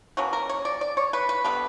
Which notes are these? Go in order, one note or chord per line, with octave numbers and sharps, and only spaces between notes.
B2 F#3 A#3 C#4 F#4
A#4
C#5
D5
D5
C#5
B4
B4
D3 G3 B3 B4